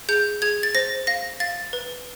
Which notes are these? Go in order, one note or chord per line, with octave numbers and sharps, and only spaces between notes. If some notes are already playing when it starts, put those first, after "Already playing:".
G#4 G6
G#4 G#6
A6
C5 A#6
F5 A#6
F5 A6
B4